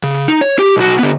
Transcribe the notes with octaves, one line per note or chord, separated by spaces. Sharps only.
C#3
D#4
C#5
G4
B1 F#4
D3 B3